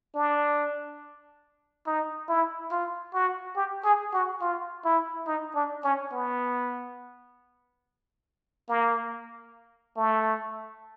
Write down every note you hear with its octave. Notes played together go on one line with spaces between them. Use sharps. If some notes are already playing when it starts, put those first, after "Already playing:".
D4
D#4
E4
F4
F#4
G4
G#4
F#4
F4
E4
D#4
D4
C#4
B3
A#3
A3